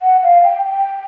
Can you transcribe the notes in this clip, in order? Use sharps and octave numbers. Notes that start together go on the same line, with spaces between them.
F#5
F5
G5
G5